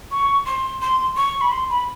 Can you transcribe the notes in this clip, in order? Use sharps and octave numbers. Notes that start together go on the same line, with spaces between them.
C#6
C6
C6
C#6
B5
C6
B5